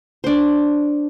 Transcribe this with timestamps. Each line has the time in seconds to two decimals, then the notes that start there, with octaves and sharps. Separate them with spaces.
0.24 D4 C5